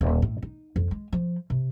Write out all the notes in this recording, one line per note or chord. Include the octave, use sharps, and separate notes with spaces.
D#1
A2
D#4
F2
G#3
F3
C3